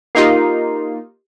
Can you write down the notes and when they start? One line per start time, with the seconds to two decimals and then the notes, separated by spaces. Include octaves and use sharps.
0.15 A#3 D#4 F4 G4 A#4 C7